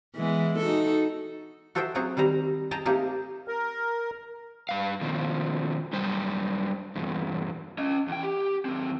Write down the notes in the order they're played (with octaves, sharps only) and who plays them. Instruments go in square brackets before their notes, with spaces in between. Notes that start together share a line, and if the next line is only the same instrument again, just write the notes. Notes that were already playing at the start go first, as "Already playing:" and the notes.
[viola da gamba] E3 G#3 B3
D#4 F#4 A4
[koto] F#4 A4 C5 D#5 E5 G5
F#3 A3 C4 F#4 G#4
D#3 G3 C4 A#5
G#4 D#5 G5 A5 A#5
A3 A#3 C4 D#4 G4 G#4
[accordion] A#4
[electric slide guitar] G2 F5
B2 D#3 F3
F#2 G3 C5
E2 G2 B2
[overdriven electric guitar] C#4 D#5
E2 G5
G4
D#2 C4